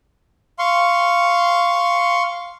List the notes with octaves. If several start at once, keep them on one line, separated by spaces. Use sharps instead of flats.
F5 C6 C#6